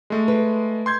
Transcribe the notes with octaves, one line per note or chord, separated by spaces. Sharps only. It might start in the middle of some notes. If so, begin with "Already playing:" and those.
G#3 A3
B4
C6 G6 G#6